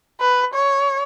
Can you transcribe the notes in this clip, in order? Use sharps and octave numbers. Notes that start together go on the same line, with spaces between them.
B4
C#5